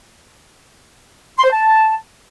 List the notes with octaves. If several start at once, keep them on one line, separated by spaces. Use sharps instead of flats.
C6
C5
A5